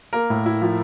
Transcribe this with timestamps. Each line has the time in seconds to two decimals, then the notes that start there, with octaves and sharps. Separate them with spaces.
0.13 A#3 A#4
0.30 A2
0.46 E4
0.62 F3